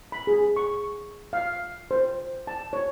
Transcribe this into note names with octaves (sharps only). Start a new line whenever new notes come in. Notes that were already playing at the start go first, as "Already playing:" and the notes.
B5
G#4
C#6
F5
C5
A5
C#5